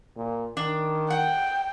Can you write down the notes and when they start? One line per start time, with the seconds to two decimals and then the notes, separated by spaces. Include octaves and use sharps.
0.16 A#2
0.57 D#3 D4
1.10 F#5 G5